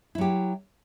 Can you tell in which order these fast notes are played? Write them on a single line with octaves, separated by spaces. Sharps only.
E4 F#3 G4